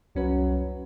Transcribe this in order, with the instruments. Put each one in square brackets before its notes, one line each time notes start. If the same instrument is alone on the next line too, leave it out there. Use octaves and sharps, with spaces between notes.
[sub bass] C2 [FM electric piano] F2 C#4 B4 [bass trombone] F#3